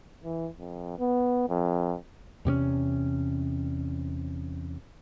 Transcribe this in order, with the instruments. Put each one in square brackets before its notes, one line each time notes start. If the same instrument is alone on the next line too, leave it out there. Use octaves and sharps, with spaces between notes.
[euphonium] E3
F2
B3
F2
[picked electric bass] E2 C3 A#3 C#4